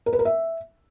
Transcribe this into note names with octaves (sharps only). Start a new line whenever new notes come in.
A#4
B4
A#4
E5